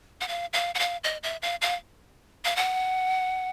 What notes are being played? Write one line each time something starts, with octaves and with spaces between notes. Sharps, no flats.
F#5
F5
F5
F#5
F5
D#5
E5
F5
F5
F5
F#5